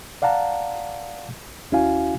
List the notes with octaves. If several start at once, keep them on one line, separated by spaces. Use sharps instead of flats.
D5 F5 F#5 A5 A#5
D#2 C#4 E4 F#4 F5 G#5